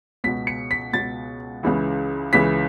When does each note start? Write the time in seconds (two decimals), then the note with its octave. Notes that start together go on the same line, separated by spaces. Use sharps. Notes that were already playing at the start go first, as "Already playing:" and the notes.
0.24 C#2 B6
0.27 B2
0.47 C#7
0.71 B6
0.93 C#2 B2 A6
1.63 C#2 C#3 E3
2.33 C#2 C#3 E3 B6